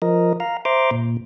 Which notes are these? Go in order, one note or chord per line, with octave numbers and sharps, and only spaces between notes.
F3 A#4 D#5
F5 A#5
C5 E5 A#5 C6 D6
A#2